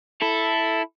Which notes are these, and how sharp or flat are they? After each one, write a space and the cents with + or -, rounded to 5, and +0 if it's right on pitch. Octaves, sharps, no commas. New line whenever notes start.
E4 +0 A4 +0